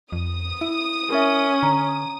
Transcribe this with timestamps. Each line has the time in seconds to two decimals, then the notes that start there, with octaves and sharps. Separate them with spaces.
0.12 F2 D#6
0.61 E4
1.10 C#4 A#4 E5
1.63 D3 A#5